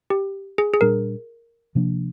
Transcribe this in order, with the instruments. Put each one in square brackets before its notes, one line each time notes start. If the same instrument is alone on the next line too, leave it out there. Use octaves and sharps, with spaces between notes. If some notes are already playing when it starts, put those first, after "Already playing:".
[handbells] G4
G#4
G#4
[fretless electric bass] A#2 G3 D4 [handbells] A#4
[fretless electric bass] C3 F3 A#3 D4